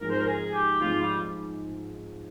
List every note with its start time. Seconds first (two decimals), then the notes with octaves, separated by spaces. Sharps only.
0.01 G#2 F3 G#3 A#4
0.10 C5
0.19 A#4
0.27 G#4
0.54 G4
0.80 G#2 F3 G#3 F4
1.01 G3